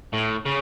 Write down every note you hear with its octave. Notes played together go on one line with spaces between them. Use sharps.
A2
C#3